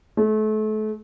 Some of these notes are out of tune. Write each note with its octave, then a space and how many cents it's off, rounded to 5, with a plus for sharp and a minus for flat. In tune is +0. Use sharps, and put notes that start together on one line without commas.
A3 -35